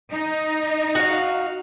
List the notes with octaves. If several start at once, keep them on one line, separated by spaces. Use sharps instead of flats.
D#4
F#4 F5